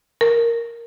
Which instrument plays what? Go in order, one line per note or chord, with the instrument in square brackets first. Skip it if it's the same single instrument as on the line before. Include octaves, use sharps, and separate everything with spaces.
[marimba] A#4